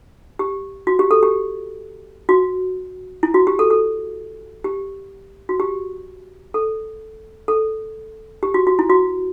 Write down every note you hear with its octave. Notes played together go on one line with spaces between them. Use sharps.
G4
F#4
G4
A4
G4
F#4
E4
F#4
G4
A4
A4
G4
F#4
G4
A4
A4
G4
F#4
F#4
E4
F#4